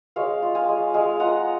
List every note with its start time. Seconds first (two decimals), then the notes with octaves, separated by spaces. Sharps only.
0.16 G#3 C#5 F5
0.42 F4
0.55 F5 G#5
0.69 G#3
0.94 G#3 F5 G#5
1.20 F4 F#5 A#5